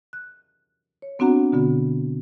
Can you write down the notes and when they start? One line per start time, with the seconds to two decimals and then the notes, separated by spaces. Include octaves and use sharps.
0.13 F#6
1.02 C#5
1.19 B3 C4 D4 F#4 F#5 A#5
1.52 B2 D3 B3 F#4